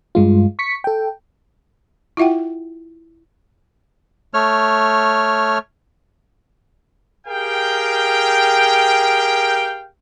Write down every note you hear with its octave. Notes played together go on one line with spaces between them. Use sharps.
G2 G#3 F4
C#6 B6 C#7
A4 G5
E4 F4 E5 F#5 G5
A3 C#5 F6
G4 G#4 A#4 F5 G5